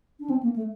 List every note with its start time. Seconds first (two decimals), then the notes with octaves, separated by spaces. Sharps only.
0.20 D4
0.30 C4
0.43 A#3
0.56 A3